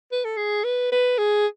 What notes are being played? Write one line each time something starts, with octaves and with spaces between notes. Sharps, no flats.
B4
A4
G#4
B4
B4
G#4